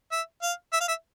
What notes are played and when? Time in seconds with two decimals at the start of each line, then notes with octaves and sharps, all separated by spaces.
0.12 E5
0.42 F5
0.73 E5
0.81 F5
0.88 E5